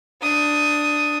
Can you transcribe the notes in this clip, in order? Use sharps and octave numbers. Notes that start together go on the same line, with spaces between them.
D4 D#6